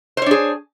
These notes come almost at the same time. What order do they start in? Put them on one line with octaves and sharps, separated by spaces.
C5 C#5 D4 G#4